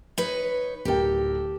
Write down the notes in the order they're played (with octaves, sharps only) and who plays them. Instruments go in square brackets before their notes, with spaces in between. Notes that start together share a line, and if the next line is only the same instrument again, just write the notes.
[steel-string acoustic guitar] D#4 B4 C#5
[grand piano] D1 A#4 G5 [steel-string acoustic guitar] G4 A4